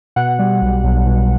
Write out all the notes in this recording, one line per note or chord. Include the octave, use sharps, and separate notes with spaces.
B2 F#5
G3
B1
B1
B2